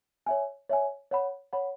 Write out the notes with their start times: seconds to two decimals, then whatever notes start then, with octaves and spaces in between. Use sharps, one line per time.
0.26 C#5 E5 G#5
0.69 C#5 E5 G#5
1.11 C#5 F#5 B5
1.53 C#5 F#5 B5